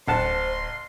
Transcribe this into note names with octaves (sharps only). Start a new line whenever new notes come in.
D1 A1 C5 F#5 A5 C6